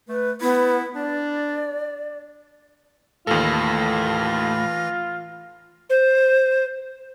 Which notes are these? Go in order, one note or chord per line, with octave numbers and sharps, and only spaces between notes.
A3 B4
B3 E4
D4 D5
D#2 A2 E3 F4 A4 A#6
C5